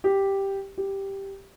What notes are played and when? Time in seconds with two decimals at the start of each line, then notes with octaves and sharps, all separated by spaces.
0.04 G4
0.78 G4